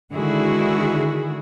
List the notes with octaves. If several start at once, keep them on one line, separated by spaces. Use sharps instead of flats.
D3 D#3 G#3 E4 F#4 G#4